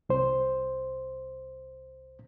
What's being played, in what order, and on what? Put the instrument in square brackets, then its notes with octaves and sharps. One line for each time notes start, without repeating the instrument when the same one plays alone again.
[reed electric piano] C2 C5